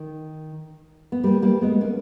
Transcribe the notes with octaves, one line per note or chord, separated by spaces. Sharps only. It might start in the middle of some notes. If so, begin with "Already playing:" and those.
Already playing: D#3
B3
G3 A#3
G3 A#3
G#3 B3
A#3 C#4